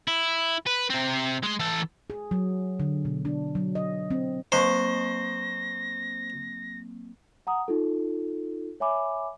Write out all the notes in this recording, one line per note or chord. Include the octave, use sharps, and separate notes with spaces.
E4
B4
C3 C4
G#3 C6
E3 A4
G#4
F#3
D3
B2
D4
F#3
D#5
C4
F#3 A#3 C4 C5 A#5 C6 C#6 A#6
F#5 A#5 D#6
D#4 F4 A4
C#5 E5 G#5 B5 D6